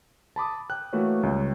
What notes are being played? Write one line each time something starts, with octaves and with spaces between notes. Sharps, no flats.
A5 B5 D6 D#6
G5 F#6
E3 A3 A#3 F#4 B4 C#5
C#2 G3 C#5 G5